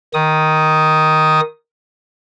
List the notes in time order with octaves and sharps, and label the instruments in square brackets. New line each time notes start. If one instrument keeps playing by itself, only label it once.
[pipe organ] D#3 D#6